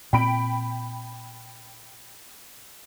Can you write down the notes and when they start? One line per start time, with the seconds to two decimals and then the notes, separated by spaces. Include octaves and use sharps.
0.13 A#2 C4 G5 B5 D7